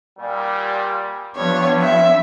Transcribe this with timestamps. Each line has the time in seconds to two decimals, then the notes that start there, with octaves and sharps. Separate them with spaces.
0.19 A#2 G3
1.36 G2 F3 B3 D4 C#5
1.82 E5